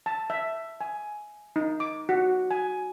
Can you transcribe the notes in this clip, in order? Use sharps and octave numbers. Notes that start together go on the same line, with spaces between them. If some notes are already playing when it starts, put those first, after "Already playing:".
A5
E5
G#5
D#4
D6
F#4
G#5